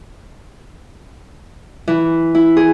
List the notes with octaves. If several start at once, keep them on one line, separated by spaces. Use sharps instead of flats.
E3
E4
G#4